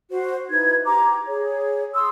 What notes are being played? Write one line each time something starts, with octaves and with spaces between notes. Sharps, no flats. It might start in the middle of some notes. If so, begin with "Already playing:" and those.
F#4 C5
D#4 E4 B4 G#6
G4 A#5 D6
G#4 C#5
C6 D#6 E6